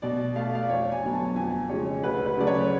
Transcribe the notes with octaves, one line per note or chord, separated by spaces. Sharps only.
B2 D5
A3 F5
F5
D5
F2 C#5
G#5
D3 F#3 B3
A5
F2 G#5
C#3 F3 G#3 C#5
D2 B4
B4
C#3 F#3 A3 D5
C#5